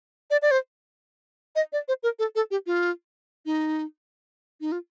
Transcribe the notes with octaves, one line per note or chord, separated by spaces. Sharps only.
D5
D5
C5
D#5
D5
C5
A#4
A4
A4
G4
F4
D#4
D#4
F4